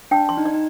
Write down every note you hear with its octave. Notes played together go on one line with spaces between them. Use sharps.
D4 G5
C6
D#4
D5
D#4